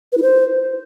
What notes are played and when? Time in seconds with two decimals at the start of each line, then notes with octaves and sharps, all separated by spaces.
0.12 B4
0.17 E4
0.22 C5